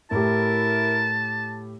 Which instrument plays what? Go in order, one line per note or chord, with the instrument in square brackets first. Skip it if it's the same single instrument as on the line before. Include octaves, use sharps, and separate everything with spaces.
[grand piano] A2 G4 [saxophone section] E4 A#4 [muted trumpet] A5